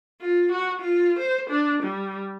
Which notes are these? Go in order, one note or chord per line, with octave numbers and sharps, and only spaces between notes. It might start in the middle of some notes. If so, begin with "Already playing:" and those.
F4
F#4
F4
C5
D4
G3